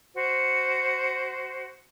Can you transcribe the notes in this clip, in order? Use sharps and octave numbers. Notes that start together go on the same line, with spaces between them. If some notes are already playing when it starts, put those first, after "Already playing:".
F#4 C5